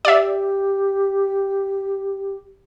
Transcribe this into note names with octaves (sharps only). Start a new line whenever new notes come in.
G4 D5 E5